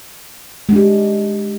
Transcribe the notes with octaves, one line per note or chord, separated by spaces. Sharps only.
G#3 D4 G4